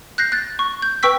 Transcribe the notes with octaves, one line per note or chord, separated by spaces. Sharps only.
F#6 G6 A#6 C7
F#6 A6
C#6
G6
B4 G5 C#6 E6 B6